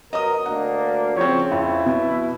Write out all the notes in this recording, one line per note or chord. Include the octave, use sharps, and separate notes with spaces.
B2 F#3 A#4 D#5 D#6
D2 A#3 D4 F#5
C#3 F3 C4 C#5
F2 E4
B2